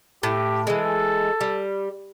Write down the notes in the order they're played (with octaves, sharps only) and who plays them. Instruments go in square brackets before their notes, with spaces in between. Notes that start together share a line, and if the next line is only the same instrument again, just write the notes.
[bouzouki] A2 [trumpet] G4
[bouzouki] E3 G#3 [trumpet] A4
[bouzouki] G3